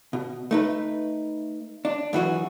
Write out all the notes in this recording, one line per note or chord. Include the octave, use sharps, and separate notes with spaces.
B2
A3 D#4 B4
D4
F#2 E3 F#4 G#4